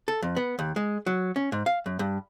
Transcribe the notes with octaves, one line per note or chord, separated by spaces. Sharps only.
A4
F2
B3
D#2
G#3
F#3
C#4
G#2
F5
F#2
G2